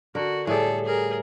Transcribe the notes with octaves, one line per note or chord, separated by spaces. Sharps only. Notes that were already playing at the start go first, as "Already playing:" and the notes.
D3 F#4 A#4
A2 G3 G#4 A4
G#4 A#4